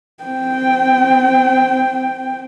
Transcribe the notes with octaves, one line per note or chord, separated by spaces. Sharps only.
C4 G5